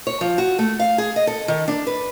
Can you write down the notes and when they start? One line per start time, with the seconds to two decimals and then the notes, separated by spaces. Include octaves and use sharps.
0.07 C#5
0.21 F3
0.38 F#4
0.59 A3
0.79 F5
0.98 G#4
1.16 D#5
1.27 A4
1.48 D#3
1.68 D4
1.87 B4